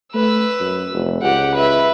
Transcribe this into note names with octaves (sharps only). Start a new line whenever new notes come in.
A3 B4 E6
F#2
F1
C#2 G4 F#5
B4 E5